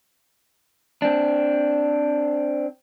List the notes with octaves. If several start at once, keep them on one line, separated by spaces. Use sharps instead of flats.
C4 D4